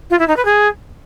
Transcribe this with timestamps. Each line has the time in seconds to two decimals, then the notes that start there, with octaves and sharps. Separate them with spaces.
0.10 F4
0.19 E4
0.28 D#4
0.36 B4
0.45 G#4